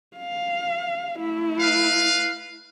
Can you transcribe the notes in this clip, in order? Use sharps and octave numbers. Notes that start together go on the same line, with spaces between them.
F5
A3 E4
B4 F5